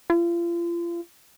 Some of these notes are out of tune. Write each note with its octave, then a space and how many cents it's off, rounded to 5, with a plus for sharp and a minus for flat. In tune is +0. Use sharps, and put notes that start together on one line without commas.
F4 -35